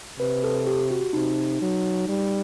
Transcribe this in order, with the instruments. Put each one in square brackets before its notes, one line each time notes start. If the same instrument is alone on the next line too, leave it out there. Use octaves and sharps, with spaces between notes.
[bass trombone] C3 [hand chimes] B4
[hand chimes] A4
G4
F#4
[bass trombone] C3 [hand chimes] D#4
[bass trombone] F#3
G3